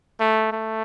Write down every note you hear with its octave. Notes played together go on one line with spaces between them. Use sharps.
A3
A3